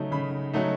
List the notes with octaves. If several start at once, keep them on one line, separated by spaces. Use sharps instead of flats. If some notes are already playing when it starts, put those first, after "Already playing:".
Already playing: C#3 F#3 A3 D#4
C#3 B5
F#3 A3 D#4